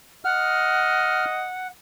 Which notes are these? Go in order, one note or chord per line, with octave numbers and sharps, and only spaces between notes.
D#5 F#5 F6